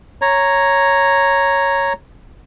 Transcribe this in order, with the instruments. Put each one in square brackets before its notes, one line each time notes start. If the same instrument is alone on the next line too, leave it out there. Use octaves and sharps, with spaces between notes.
[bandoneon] C#5 A#5